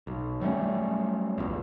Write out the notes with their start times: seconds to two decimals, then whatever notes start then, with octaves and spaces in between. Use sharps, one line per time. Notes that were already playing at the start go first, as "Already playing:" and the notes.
0.07 B1
0.41 F#3 G3 A3 C#4
1.38 A#1 E2